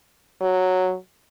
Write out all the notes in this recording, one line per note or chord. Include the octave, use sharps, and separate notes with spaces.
F#3